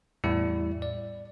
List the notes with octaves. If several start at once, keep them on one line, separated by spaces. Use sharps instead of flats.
E2 A2 G3 E4 D5
D5